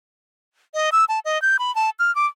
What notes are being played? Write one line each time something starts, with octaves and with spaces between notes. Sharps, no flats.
D#5
E6
A5
D#5
G6
B5
A5
F6
D6